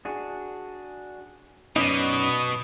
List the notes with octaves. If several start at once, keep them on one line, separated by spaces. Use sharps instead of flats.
D4 F#4 G#4
F#2 B2 C#4 D#4 B4 D5 D#6